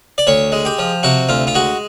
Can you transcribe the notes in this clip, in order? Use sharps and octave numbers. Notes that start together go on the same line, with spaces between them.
D5
D2 C#5
G#3
G4
F3
C3 F#4
D2 F4
F4
G#3 F#4